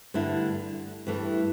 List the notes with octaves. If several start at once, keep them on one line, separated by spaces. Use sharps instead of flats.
G2 D3 A3 E4
G2 E3 A3